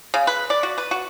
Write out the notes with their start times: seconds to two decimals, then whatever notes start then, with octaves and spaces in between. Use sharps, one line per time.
0.14 C#3
0.27 B4
0.50 D5
0.63 F#4
0.78 B4
0.91 F#4